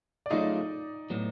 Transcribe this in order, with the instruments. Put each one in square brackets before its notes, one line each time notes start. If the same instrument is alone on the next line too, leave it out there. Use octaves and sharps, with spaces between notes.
[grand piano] D5
[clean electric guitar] F#3 A3 C#4 F4 G#4 [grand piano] D#4 D#5
[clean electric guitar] A2 F#3 B3